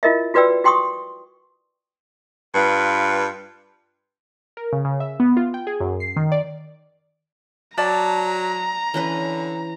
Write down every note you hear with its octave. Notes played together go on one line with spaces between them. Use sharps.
E4 F4 A#4 D#5 E5
F4 F#4 B4 D5 G5 E6
F#4 G5 C6 C#6 D#6
G2 F4 B4
A#4
C#3
C#3
E5
B3
F4
G5
G#4
F#2
C7
D#3
D5
F#3 D5 G5 A5 A#5
D3 E3 C#4 B4